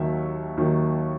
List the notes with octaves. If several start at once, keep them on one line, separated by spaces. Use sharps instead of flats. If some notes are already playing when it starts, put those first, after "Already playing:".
Already playing: D#2 D#3 F#3 E5
D#2 D#3 F#3